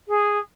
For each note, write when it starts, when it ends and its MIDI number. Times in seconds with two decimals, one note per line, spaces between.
0.08 0.38 68